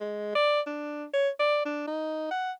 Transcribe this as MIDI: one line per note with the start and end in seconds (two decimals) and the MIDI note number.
0.01 0.32 56
0.35 0.61 74
0.67 1.05 62
1.14 1.29 73
1.39 1.64 74
1.65 1.87 62
1.87 2.30 63
2.31 2.52 78